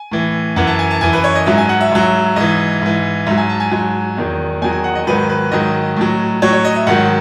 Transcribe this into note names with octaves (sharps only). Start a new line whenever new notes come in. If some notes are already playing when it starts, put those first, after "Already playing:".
Already playing: G#5
A2 E3
F#2 E3 F#5
A5
G#5
A5
F#2 E3 G#5
B4
C#5
D#5
G#2 F#3 E5
G#5
F#5
E5
G#2 F#3
G#2 E3 D#5
G#2 E3
G#2 F#3 E5
G#5
A5
G#5
G#2 F#3
E2 D#3 F#3
E2 D#3 F#3 G#5
G#5
F#5
D#5
G#2 D#3 F#3 B4
B4
G#2 D#3 F#3 D#5
A2 F#3
A2 F#3 C#5
C#5
D#5
E5
G#2 D#3 F#3 F#5